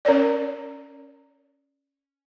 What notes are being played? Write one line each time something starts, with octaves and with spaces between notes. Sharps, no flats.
C#4 A#4 C#5 D5